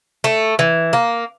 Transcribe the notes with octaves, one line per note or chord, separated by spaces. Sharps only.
A3
E3
A#3